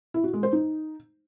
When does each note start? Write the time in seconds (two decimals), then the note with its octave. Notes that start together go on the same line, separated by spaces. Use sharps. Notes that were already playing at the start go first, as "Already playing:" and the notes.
0.14 E4
0.24 F#4
0.33 G#3
0.43 C5
0.53 D#4